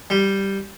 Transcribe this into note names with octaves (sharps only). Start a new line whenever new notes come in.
G3